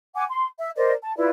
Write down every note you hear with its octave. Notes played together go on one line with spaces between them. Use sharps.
F#5 G#5 D6
C6
E5
A#4 C5 D5 D#5
A5
E4 F4 B4 D5